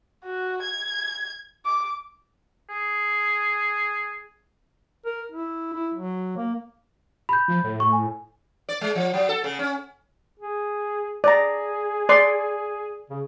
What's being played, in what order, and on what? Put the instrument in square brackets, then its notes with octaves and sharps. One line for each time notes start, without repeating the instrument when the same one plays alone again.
[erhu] F#4
G#6
D6
[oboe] G#4
[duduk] A#4
E4
E4
F#3
A#3
[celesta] B5 G6
[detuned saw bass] F3
A2
[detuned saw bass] A2 [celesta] C#6
[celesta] G#5
[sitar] D5
G#3
F3
F#3
A4
C#3
C#4
[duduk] G#4
[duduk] G#4 [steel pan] D5 A#5
[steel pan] D5 C6
[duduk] C#3